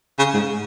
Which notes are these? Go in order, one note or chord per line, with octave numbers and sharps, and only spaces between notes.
C#3
G#2